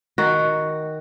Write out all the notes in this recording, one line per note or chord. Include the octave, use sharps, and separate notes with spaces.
D#3 F#4